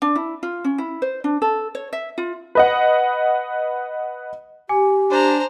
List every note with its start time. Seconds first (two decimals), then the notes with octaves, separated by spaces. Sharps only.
0.02 D4
0.16 E4
0.43 F4
0.64 C#4
0.78 E4
1.02 C5
1.24 D4
1.42 A4
1.75 C#5
1.93 E5
2.18 F4
2.55 B4 D#5 F#5
4.69 G4 G#5 D6
5.10 D4 C5 A#5